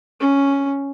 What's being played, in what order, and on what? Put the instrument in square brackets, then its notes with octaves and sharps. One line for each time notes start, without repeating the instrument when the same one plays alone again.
[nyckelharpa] C#4